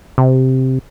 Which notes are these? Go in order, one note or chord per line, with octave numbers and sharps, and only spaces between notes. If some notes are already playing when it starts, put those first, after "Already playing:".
C3